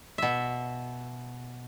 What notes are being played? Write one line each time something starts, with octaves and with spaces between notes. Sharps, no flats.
B2 E5